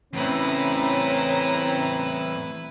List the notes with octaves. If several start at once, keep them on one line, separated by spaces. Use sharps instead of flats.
E2 A2 C4 C#4 E4 B4 A#5